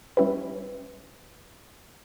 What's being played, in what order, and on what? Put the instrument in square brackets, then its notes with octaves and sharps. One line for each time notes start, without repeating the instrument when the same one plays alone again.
[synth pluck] G3 C#4 E4 G4 B4